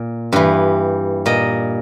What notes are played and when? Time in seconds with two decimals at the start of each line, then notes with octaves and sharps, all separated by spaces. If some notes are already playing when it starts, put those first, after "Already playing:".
Already playing: A#2
0.33 G2 E3
1.26 A#2 D#5